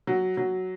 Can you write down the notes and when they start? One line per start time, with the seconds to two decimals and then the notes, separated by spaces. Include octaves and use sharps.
0.07 F#3
0.37 F#3